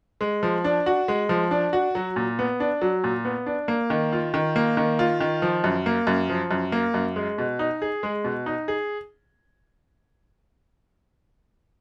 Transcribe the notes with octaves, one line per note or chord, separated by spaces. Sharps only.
G#3
F3
D4
F#4
G#3
F3
D4
F#4
F#3
A#2
B3
D4
F#3
A#2
B3
D4
A#3
D#3
F4
D#3
A#3
D#3
F4
D#3
F3
F#2
A#3
F#2
F3
F#2
A#3
F#2
G#3
B2
D#4
G#4
G#3
B2
D#4
G#4